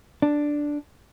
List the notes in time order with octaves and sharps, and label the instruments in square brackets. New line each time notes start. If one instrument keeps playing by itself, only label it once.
[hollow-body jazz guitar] D4